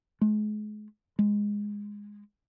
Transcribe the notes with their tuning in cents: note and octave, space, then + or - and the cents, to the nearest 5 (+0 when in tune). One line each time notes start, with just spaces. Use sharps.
G#3 +35
G#3 -10